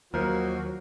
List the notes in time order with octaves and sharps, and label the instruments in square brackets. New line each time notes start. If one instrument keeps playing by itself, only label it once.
[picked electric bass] D#2 [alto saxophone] F3 [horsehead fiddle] F#3 [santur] A#4